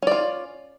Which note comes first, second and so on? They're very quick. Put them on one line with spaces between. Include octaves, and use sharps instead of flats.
C#4 D5 F4